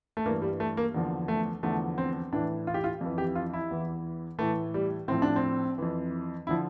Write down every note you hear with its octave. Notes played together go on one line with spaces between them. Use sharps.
A3
G2 E3 A#3
G3
A3
A#3
E2 D3 F3
A3
E2 D3 F3 A3
C4
A2 E3 D4
F4
G4
F4
F2 E3
G4
F4
E4
E2 E3
A2 E3 A3
G3
A2 F3 C4
D4
C4
F2 E3
D3 F3 E4